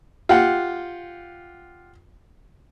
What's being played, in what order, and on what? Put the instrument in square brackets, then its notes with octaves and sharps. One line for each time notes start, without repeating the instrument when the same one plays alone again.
[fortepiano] F4 G4 F#5